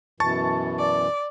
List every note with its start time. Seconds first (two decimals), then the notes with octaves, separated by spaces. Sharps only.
0.20 F#2 B2 E3 A5 C#6 A6
0.78 D5